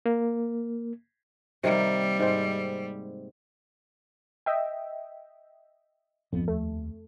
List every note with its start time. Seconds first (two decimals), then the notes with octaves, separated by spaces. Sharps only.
0.06 A#3
1.64 C3 D#3 G3 A#3
2.20 G#2 C4
4.46 D#5 E5 G5
6.32 D1 G#1 F2 B3
6.48 D#2 A3